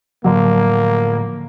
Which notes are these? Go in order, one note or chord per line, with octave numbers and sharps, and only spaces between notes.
A2 D3 F3 F#3 A#3